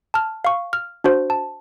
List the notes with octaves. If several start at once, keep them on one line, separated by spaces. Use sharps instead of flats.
A5 F6
F5 C#6
F6
D4 F#4 C5
A5